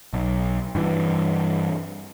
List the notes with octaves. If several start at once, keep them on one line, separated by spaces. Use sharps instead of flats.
B1
G2 E3